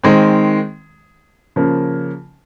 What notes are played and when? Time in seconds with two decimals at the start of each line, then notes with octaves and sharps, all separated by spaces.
0.03 D#3 G#3 C4
1.56 C#3 F3 A#3